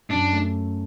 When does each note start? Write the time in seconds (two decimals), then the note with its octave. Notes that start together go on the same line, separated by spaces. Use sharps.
0.11 F#2 D4
0.33 A3